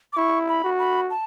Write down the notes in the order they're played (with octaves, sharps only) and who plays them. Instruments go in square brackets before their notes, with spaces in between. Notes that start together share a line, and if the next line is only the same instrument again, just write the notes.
[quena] D6
[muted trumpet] E4 [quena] C#6
[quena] B5
[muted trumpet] F#4
[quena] B5
A5